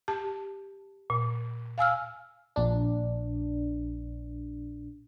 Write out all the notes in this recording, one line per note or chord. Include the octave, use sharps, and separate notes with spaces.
G4 A5
A#2
F5 G#5 E6 F6
A#1 D4